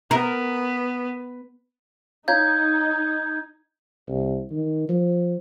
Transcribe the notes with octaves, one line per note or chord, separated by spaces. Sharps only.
B3 A#4
D#4 E4 C#5 F5 G6 G#6
C2
D#3
F3